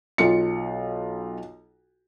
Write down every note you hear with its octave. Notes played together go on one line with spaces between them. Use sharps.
B1 F4 C#7